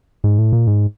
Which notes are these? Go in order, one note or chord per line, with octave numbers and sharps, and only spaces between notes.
G#2
A2
A#2
G#2